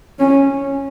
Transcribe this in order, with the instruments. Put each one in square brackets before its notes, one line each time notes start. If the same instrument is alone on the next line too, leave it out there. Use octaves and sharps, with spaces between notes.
[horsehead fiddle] C#4